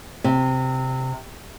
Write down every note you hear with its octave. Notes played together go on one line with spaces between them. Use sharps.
C3